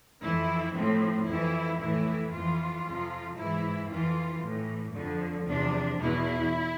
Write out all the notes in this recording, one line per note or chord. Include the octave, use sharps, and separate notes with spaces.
F2 E3 E4
A2 F3 C4
F2 E3 E4
A2 E3 E4
F2 E3 F4
F2 C3 F3
G#2 E3 E4
F2 E3 F4
A2 E3
F2 D3 F3
E2 C3 F3 D4
E2 B2 E4